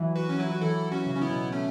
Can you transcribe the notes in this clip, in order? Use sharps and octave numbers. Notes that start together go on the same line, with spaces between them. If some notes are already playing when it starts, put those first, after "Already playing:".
Already playing: E3 F#3
E3 F#4 B4
C#4
F#3 E4
F#4
E3 E4 A4
C#4 F#4
C#3
C#4
B3 E4
B2
A3 C#4